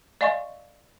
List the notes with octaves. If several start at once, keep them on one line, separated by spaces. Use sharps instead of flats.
D5 D#5 F5 G#5 C6 C#6